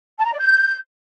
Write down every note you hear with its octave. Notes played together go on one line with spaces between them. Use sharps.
A5
A#5
D5
G6